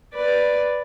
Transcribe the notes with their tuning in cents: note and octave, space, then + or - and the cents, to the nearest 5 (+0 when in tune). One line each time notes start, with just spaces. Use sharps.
B4 +0 D5 +0